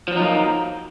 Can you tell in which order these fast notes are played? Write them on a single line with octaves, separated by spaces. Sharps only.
F3 F#3 D#4 A#3